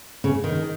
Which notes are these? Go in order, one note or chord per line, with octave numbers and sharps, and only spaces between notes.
C#3
D#3